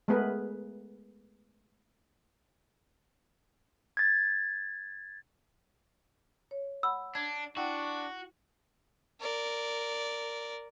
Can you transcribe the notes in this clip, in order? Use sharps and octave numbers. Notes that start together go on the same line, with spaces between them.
G#3 A3 B3 G#4 A#4 B4
G#6 A6
C#5
F#5 B5 E6
D4 G#6
D4 E4 F#4 F#5 G5
A#4 D5